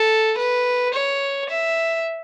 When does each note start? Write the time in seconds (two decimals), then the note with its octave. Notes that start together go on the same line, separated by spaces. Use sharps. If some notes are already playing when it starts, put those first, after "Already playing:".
Already playing: A4
0.37 B4
0.93 C#5
1.49 E5